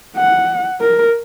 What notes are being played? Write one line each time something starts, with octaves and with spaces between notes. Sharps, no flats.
F#5
A#4